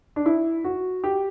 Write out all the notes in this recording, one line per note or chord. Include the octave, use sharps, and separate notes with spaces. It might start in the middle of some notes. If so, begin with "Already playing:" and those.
D4
E4
F#4
G4